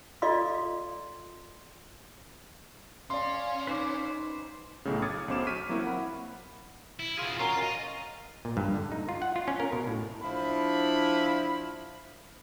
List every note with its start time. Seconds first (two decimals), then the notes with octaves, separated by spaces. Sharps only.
0.22 F4 A4 D5 D#5 F5 C6
3.10 C#4 D5 F5 C6
3.67 D#4 B4 C5 D6
4.85 B1 A2 C#3
5.02 D6 D#6 F6 G#6 A6 C#7
5.28 B1 B2 C#4 C5 D6 E7
5.47 C#6 D6 F6 B6 D#7
5.69 F#3 A#3 C4 E4 F#4
5.84 F#5 B5
6.99 E4
7.18 B2 F4 G#4 F5
7.39 C#4 F4 F#4 A#4
7.63 D#5 F5
8.45 A#2
8.57 G2
8.74 D3
8.92 D#4
9.09 F4
9.22 F#5
9.36 F4
9.48 C#4
9.60 A#4
9.72 B2
9.87 A2
10.22 F3 D4 E4 B5